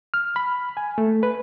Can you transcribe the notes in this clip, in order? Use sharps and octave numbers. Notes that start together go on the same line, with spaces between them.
F6
B5
G#5
A3
B4